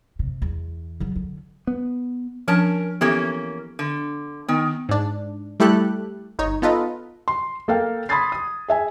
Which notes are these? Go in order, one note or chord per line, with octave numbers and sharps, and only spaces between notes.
C3
E2
C#3 F#3
D3
B3
F3 C#4 D4 A#4 A5
E3 A#3 B3 C#4 G4 A4
D3
D#3 B3
G#2 D4
G3 A3 E4 G4 A4 F#6
G1 D#4 C#5
B3 D#4 F4 A4 B4 D#5
C6
A#3 A4 A#4 F5 G5
B5 C6 D#6 G#6 A6 C7
D#6
G#4 E5 G#5